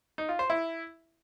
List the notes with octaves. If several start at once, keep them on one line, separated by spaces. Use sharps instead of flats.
D#4
F4
C5
E4